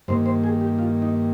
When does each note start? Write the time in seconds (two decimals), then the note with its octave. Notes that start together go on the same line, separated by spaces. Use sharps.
0.08 G2 D#3 A#3 C5
0.26 C5
0.44 G#4
0.61 G4
0.79 F4
1.02 D#4